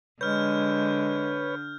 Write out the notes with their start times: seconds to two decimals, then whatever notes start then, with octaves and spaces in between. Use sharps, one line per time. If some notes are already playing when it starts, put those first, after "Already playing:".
0.21 D3 G#3 B4 C#5 F6 G6